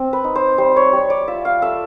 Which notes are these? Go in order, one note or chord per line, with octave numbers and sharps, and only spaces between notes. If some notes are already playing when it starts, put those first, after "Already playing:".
Already playing: C4
B4
D#4
C5
G3 C5
C#5
G3 C#5
D5
F4 E5
F5
A3 E5